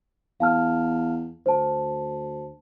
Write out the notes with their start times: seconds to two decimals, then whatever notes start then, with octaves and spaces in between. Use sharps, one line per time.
0.40 E2 F5 A5 F6
1.46 D2 C5 A5